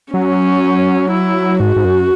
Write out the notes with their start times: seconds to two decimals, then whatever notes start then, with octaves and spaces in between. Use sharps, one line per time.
0.13 F#3 C#4
1.11 E4
1.60 G#2 F#4
1.76 G#2
1.85 F#2